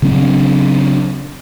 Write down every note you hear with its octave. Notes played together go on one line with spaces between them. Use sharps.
C#3 F#3 C4 D4